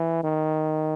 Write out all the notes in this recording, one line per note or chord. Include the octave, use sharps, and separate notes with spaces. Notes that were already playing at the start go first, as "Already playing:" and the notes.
Already playing: E3
D#3